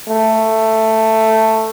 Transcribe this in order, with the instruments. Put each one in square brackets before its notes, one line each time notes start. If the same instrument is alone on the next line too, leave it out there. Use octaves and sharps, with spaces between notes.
[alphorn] A3